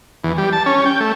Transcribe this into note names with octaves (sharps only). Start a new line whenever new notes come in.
E2
G3
A5
C#4
G5
A3